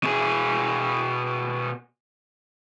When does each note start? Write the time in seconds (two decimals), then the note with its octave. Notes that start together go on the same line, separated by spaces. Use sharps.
0.03 B2 G#4